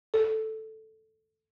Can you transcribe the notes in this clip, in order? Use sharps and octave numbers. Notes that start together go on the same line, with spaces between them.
A4